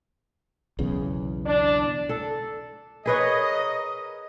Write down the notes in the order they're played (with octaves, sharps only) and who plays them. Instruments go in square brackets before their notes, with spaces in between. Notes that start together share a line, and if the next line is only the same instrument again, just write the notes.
[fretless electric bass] B1 E2 C#3
[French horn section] D4
[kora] A4
[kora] G#4 B4 C#5 [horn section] A#4 D#5